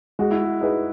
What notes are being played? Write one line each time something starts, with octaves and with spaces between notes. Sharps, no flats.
G#3 F#4
E4
F#4
D#4 G#4 B4